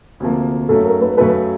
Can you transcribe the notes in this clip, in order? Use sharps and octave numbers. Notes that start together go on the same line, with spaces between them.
D2 C3 F3 A#3
F#2 C#3 F#3 A3 A4
A#4
B4
F#2 C#3 F#3 A3 B4